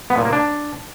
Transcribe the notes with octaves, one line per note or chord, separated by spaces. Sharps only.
B3
A#2
A#3
D4